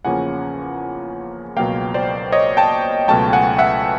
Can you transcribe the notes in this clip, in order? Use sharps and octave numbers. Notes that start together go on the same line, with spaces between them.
E2 C#3 F3 A#3 C#4 F#5 G#5
C#2 B2 F#3 A#3 F5 G5
C5 D5
C#5 D#5
G5 A5
C#2 B2 F#3 A3 G5 A5
F#5 G#5
E5 F#5